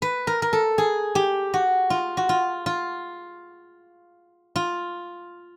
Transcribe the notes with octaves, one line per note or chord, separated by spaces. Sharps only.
B4
A#4
A#4
A4
G#4
G4
F#4
F4
F#4
F4
F4
F4